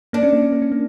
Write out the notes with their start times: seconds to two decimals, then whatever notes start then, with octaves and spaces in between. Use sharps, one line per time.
0.13 A#3 D4
0.23 C#4
0.33 A#3
0.42 C#4
0.52 A#3
0.62 C#4
0.72 A#3